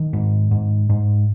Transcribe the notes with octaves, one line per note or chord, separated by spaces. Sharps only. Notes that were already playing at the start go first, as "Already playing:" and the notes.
Already playing: D#3
G#2
G#2
G#2